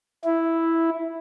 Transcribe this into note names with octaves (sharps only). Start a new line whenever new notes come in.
E4